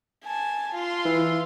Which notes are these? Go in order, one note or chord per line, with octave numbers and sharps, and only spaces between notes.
G#5 A5
F4 C6
E3